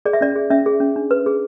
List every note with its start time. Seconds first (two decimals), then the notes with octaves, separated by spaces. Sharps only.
0.05 G#4 D5
0.13 E5
0.21 C#4 D5
0.35 G#4
0.51 C#4 E5
0.66 G#4
0.80 C#4
0.96 D4
1.11 B4
1.26 G#4